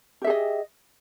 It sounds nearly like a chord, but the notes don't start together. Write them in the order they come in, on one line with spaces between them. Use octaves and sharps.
G4 E5 G#4 D#5